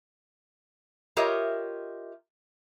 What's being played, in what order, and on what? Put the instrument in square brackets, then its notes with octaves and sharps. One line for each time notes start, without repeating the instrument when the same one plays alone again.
[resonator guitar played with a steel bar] F4 G4 A#4 C#5 D#5 E5